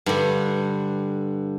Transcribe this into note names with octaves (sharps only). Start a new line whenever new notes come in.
G2 D3